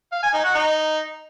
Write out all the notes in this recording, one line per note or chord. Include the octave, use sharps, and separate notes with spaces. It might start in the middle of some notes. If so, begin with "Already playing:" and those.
F5
G#5
D#4
F#4
D#4